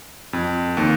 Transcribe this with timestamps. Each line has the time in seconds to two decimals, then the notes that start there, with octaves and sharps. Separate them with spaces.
0.33 F2
0.77 D#2